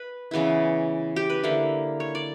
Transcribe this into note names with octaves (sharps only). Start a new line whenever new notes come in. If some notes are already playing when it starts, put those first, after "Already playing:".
Already playing: B4
C#3 E3 B3 E4
G4
B4
D3 A#3 E4
C#5
D5